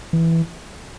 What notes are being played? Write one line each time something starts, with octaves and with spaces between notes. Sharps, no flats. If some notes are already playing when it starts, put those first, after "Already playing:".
E3